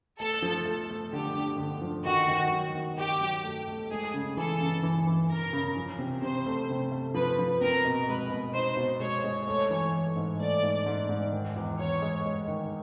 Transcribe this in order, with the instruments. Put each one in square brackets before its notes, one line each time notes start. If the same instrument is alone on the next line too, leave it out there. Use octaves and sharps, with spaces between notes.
[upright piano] A3 [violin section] A4
[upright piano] F3
A3
A3
[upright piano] D3 [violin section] G4
[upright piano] D3
D3
F3
[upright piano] D#3 [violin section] F#4
[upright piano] D#3
F#3
D#3
[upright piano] D#3 [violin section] G4
[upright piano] F#3
A3
A3
[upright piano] G#3 [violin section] G#4
[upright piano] C#3
[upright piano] E3 [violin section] A4
[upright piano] C#3
E3
E3
[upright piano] E3 [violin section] A#4
[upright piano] C#3
F3
C3
[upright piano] C3 [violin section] C5
[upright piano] A3
C3
A3
[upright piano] F3 [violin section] B4
[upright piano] F3
[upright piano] C4 [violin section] A#4
[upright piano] B2
[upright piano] G#3 [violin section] B4
[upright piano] B2
[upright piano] D#4 [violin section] C5
[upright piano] B2
[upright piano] G#3 [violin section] C#5
[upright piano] G#3
[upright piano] A3 [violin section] C#5
[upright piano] E3
A3
G#2
[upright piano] A3 [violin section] D5
[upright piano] G#2
G#2
G#2
D#3
E2
[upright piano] E2 [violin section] C#5
[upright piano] G#3
G#3
D#3